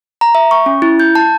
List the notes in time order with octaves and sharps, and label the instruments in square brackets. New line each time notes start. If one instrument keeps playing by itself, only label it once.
[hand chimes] A#5
E5
C#6
C#4
E4
G6
A5